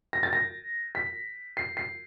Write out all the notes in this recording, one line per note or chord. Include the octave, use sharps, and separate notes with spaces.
A#6
A6
A#6
B6
C7
C7